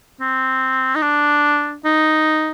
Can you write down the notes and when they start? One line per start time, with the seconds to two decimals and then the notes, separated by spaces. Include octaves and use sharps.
0.20 C4
0.95 D#4
1.02 D4
1.85 D#4